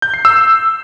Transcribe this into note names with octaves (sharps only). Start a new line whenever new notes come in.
G6
C7
E6